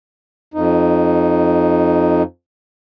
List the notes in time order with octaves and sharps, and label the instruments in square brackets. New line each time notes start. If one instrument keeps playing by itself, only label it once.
[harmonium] F2 D#4